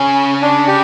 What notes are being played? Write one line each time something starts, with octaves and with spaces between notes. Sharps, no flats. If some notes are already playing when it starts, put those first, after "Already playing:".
Already playing: C#3 C#4
D4
G4